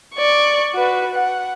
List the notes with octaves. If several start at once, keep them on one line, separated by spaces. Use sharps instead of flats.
D5 C#6
F#4 B4
F#5